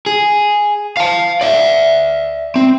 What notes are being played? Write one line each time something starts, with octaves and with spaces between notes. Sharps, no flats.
G#4
F5 A5
D5 E5
C4